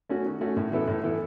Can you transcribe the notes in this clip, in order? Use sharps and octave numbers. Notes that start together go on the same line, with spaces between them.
A3 C#4 F#4
D#3
A3 C#4 F#4
A2
E3 B3 E4 A4
A2
E3 B3 E4 A4